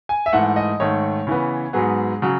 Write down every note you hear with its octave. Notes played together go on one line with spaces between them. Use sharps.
G#5
E5
G#2 E3 A3 F#5
D#5
G#2 D#3 A3 C#5
C#3 E3 B3
G#2 F#3 B3 G#4
C#3 F#3